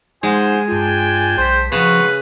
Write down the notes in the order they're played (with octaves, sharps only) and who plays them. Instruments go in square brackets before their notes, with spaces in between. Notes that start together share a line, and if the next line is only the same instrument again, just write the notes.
[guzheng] G#3 [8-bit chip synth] D#4 [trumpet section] F4 C5 F#5 [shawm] G#5
[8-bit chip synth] G2 F4 [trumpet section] D4 G5 A5
[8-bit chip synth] B1 B6 [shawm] C5
[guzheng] C#3 [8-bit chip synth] F3 C#4 C7 [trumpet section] F4 F#4 C#6 [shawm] B4